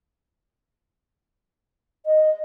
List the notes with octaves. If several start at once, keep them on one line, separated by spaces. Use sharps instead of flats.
D#5